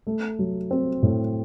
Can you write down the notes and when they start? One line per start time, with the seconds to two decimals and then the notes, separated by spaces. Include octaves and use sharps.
0.07 A3
0.39 F#3
0.71 C4
1.03 A2